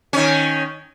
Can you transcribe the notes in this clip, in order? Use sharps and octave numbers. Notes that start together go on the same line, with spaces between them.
D#3 C#4